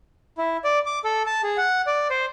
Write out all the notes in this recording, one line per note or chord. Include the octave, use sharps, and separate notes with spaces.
E4
D5
D6
A4
A5
G#4
F#5
D5
C5